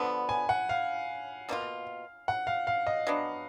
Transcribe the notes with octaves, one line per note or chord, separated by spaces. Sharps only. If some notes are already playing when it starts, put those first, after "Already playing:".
Already playing: D3 F3 B3 B5
G#5
F#5
F5
B2 A#3 D4 F4
F#5
F5
F5
D#5
F#3 B3 D4